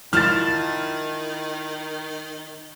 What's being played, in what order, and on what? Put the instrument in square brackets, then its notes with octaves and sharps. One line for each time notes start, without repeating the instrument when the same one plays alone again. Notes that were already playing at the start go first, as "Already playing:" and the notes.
[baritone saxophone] D#3 [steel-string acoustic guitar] E4 F4 A5 [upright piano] F6 A6